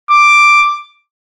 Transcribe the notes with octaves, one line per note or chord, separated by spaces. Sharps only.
D6